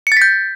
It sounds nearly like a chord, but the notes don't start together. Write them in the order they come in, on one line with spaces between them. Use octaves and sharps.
C#7 A6 B6 G6